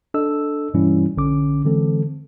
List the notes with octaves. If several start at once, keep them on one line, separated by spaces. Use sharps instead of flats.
D4 A4 D#5 E6
G2 B2 E3 G3 C#4 E4
A#1 D3 C#4 D6
D3 E3 G#3 C4 A4